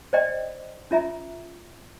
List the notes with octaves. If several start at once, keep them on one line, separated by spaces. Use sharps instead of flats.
C5 D5 D#5 G5
C#4 F4 E5 A#5